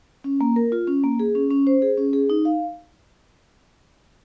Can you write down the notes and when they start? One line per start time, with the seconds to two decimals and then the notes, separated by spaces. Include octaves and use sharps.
0.24 C#4
0.41 A#3
0.56 A#4
0.72 F4
0.87 C#4
1.04 A#3
1.19 G#4
1.35 C#4
1.50 C#4
1.67 C5
1.82 G#4
1.97 C#4
2.13 G#4
2.30 D#4
2.45 F5